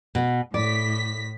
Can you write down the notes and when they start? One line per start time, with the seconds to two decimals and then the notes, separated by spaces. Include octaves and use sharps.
0.15 B2 B3
0.54 A2 D5 B6